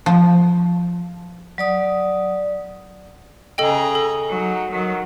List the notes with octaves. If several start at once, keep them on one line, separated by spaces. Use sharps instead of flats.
F3
F#3 D5 D#6
C#3 G#4 A4 D#5 G5 A#5
A4
F#3 D#4
D#3 F#3